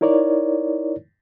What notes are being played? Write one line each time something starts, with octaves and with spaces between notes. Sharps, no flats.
D#4 E4 A#4 C#5 D5